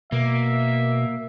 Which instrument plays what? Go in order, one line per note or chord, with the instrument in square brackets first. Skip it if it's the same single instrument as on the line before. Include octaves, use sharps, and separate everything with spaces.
[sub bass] B2 [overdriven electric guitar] A#3 [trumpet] E5